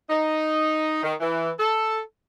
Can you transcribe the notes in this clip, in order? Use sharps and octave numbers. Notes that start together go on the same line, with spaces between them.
D#4
D#3
E3
A4